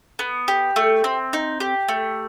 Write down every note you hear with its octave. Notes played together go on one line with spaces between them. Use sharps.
B3
G4
A3
C4
D#4
G4
A3